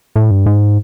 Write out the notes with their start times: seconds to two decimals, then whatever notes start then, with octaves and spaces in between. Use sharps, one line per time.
0.16 A2
0.31 G2
0.46 G#2